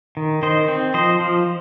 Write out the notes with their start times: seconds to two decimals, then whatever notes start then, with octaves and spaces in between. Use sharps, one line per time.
0.17 D#3
0.43 D#3 C5 D#5
0.68 C4
0.94 F3 C5 D#5
1.20 F3